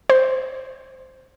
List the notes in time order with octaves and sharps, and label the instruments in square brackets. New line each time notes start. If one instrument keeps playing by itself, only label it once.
[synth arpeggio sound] C5